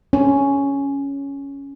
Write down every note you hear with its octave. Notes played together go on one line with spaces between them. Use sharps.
C#4